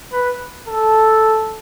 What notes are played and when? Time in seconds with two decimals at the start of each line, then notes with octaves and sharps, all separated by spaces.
0.13 B4
0.68 A4